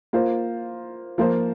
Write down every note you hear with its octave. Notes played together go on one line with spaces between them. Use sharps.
A#3 F4 C5
F3 A#3 F4 C5